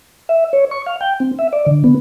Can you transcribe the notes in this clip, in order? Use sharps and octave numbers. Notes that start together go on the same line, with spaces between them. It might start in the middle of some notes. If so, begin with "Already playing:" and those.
E5
C#5
C#6
F5
G5
C4
E5
D5
D3
B3